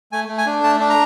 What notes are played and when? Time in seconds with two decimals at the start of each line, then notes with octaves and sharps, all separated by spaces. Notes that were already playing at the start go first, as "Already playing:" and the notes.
0.12 A3 G#5
0.28 A3
0.38 G#5
0.46 D4
0.63 A3 A5
0.80 D4
0.89 A#5